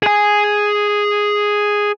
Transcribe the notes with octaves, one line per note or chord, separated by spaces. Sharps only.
G#4 G#5